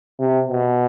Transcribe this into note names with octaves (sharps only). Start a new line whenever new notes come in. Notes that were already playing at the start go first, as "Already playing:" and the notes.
C3
B2